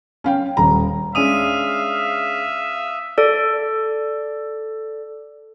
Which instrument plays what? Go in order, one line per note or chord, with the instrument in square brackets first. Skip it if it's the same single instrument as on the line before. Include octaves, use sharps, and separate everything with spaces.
[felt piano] C#4 F5 G5
D#1 A#5
[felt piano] G#3 C#4 D4 [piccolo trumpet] E5 [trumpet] F5 [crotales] D#6 D#7
[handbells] A4 D5